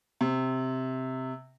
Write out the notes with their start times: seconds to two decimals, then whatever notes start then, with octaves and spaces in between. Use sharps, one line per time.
0.21 C3